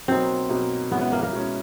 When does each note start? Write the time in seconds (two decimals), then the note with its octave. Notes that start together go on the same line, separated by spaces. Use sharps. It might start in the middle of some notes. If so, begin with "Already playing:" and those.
0.08 B2 F#3 A#3 C4 D#4
0.49 B2 F#3 A#3 D#4
0.91 B2 G#3 B3 C#4 E4
1.01 B3
1.12 A#3
1.23 A#3
1.33 B2 G#3 C#4 E4